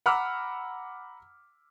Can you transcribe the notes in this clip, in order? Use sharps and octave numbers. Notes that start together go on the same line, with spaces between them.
F#5 A#5 B5 D6 E6 F6